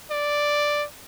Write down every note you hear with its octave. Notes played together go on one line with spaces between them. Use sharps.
D5